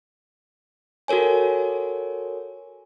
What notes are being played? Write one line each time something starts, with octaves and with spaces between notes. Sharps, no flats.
F#4 A4 A#4 C#5 G#5